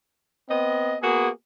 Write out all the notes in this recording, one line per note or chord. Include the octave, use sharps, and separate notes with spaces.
B3 C4 D#5
A#3 B3 F#4 G#4